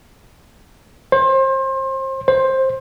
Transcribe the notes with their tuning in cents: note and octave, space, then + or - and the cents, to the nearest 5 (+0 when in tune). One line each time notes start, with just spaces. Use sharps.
C5 +30
C5 +15